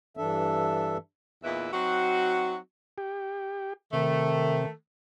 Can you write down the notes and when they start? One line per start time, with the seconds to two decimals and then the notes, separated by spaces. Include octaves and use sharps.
0.17 G2 E3 D4 A4 E5
1.43 E2 A#2 D#4 E4 B4 E5
1.72 F#3 C4 D#4 F#4
2.98 G4
3.93 C3 D#3 A3